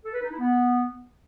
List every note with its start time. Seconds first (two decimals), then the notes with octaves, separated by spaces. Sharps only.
0.05 A4
0.14 B4
0.22 D#4
0.31 E4
0.39 B3